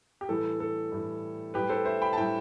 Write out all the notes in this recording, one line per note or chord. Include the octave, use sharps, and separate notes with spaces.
G4
A2 E3 G3 A4
A4
A2 E3 G3
A2 G3 G4 B4
A4 C5
C5 E5
G5 B5
A5
A2 G3 E5 G5